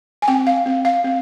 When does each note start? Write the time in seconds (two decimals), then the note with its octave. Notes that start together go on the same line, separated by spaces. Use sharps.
0.22 G#5
0.28 C4 G5
0.47 F5
0.66 C4
0.85 F5
1.04 C4